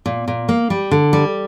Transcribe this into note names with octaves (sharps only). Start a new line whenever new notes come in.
A#2
A#2
A#3
G3
D3
G3